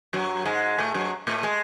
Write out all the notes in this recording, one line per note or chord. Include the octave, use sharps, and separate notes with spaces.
F#2 F#3
G#2 G#3
A2 A3
F#2 F#3
A2 A3
G#3